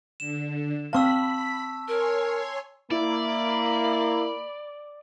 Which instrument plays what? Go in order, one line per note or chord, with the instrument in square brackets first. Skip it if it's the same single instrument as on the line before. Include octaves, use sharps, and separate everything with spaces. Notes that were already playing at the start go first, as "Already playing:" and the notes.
[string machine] D3 [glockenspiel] E7
[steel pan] C4 F5 [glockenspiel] A5 C#6 E6 [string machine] B5 B6
[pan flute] A#4 [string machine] C#5 G#5 C6
[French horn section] A#3 [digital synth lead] E4 [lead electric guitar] D5 [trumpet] B5